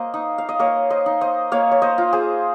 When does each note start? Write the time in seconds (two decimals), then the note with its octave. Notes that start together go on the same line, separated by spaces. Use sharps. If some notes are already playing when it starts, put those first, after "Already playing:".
Already playing: A#3 C5 D#5
0.14 D#4
0.38 F5
0.49 D#5
0.59 A#3 A#4 C#5
0.90 C5 D#5
1.06 D#4
1.21 C5 D#5
1.52 A#3 C#5 F5
1.71 C#5
1.82 C5 D#5
1.98 F4
2.13 G#4 C5